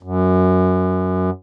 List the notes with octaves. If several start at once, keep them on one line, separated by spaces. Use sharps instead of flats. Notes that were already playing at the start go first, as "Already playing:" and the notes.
F#2